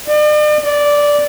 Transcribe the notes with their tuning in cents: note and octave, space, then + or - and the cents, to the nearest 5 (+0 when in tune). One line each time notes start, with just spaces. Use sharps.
D5 +40
D5 -10